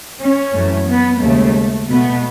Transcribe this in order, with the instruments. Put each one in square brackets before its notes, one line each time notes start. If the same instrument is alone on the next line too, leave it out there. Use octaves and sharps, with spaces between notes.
[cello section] C#4
F#2 E3 A3
B3
D#2 C#3 G#3 A3
B2 A3 B3